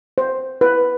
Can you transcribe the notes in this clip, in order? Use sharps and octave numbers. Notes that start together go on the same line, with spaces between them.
C5
B4